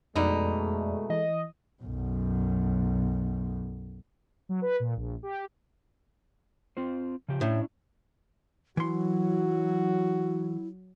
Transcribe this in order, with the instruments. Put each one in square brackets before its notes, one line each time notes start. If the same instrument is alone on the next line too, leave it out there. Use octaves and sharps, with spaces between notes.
[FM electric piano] F2 D5 [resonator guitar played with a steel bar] B2 D#4 [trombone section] G#3 A3
[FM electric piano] E3 [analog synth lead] D#5
[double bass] B1 F#2
[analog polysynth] F#3
B4
A#2
A#1
G4
[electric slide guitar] C4 F4 C5
C#3 F3 G4
[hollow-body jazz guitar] A2 [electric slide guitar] C#4 D4 E4
[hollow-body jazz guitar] E3 C6 [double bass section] F#3 [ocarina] E4 [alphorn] F#4